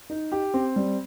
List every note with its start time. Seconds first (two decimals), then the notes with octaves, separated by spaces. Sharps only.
0.10 D#4
0.32 G4
0.54 C4
0.76 G3